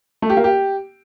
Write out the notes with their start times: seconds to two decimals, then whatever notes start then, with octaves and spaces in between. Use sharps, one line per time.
0.22 A3
0.30 G4
0.37 A#3
0.44 G4